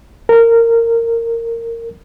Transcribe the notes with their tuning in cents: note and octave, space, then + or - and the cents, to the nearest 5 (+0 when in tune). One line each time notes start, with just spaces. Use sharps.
A#4 -15